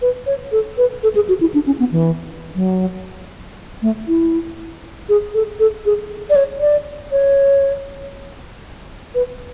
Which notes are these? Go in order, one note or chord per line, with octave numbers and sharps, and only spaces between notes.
B4
C#5
A4
B4
A4
G#4
F#4
E4
D4
C#4
B3
E3
F#3
A3
E4
G#4
A4
A4
G#4
D5
C#5
D5
C#5
B4